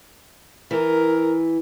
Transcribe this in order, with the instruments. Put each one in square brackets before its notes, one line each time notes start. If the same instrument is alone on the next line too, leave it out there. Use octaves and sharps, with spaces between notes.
[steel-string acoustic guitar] E3 [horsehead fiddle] A#4